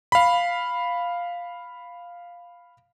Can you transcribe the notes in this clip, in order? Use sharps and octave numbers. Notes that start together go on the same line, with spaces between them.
F5 B5